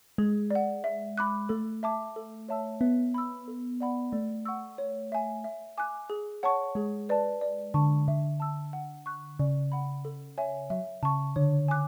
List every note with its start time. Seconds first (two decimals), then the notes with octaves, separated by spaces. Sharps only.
0.18 G#3 G#4
0.51 D5 F#5
0.84 E5
1.17 B5 D6 F#6
1.49 A3 A4
1.83 E5 A5 D6
2.16 A4
2.49 C#5 E5 A5 E6
2.81 B3 E5
3.14 B5 E6
3.48 A4
3.81 D5 F#5 B5
4.12 A3 D5
4.45 F#5 C#6 E6
4.78 C#5
5.12 E5 G#5
5.44 E5
5.78 G#5 D6 F#6
6.10 G#4
6.43 C#5 F#5 A5 C#6
6.75 G#3 G#4
7.09 B4 D5 A5
7.41 D5
7.74 D3 A5 C#6
8.08 D3 E5
8.40 A5 E6
8.73 F#5
9.06 C#6 F#6
9.39 C#3 D5
9.72 F#5 B5
10.05 A4
10.38 C#5 E5 G#5
10.70 F#3 E5
11.03 C#3 A5 C#6
11.36 D3 C#5
11.68 G#5 D6 F#6